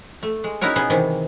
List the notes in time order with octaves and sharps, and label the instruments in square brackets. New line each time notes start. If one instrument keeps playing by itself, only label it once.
[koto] A3
G#3
C#4 D#4 E4 F#4 A#4 C#5
B2 B3 C#4 G#4
C3 D#3 E3